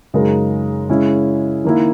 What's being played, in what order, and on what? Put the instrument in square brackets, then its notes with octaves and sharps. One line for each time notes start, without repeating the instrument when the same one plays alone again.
[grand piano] F#2 C#3 G#3 D#4 A#4
C#3 G#3 C#4 E4
D#3 A#3 E4